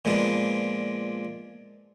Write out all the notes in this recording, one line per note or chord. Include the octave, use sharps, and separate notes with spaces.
A#2 F3 G#3 B3 D4